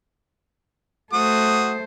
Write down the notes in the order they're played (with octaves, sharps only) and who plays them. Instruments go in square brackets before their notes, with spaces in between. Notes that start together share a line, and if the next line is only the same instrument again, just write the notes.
[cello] A3 C5 [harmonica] F#4 D#6